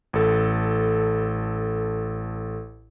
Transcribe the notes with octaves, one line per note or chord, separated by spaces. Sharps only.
A1 A4